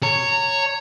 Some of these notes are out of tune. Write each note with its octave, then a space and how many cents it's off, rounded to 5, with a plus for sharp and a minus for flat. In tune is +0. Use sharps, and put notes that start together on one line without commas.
C#5 +0 A#5 -25